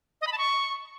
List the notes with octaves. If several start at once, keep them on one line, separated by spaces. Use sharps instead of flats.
D#5
B5
A5
C#6